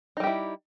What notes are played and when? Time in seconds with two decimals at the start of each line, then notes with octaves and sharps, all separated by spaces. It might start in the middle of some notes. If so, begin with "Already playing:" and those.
0.17 D#4
0.20 G3
0.24 G4
0.27 E4